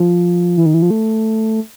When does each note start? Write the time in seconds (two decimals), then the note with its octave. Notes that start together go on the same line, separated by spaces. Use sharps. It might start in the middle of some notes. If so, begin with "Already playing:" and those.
Already playing: F3
0.57 E3
0.66 D#3
0.74 E3
0.82 F3
0.90 A3